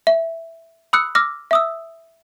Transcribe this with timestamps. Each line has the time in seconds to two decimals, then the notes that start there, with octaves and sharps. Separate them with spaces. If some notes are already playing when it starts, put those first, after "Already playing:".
0.07 E5
0.93 B5 D#6 E6 F#6 C#7
1.15 D6 E6 F6 A#6
1.51 E5 D#6 E6